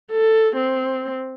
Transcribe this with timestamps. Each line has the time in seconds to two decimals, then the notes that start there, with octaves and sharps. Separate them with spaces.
0.11 A4
0.56 C4